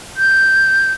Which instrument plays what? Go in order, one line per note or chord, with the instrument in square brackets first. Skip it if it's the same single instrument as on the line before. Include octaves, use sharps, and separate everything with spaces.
[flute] G6